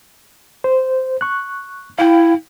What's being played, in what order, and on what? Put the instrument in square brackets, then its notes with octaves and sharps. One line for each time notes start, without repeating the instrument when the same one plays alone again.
[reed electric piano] C5
C#6 F#6
[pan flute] E4 [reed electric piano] F5 G5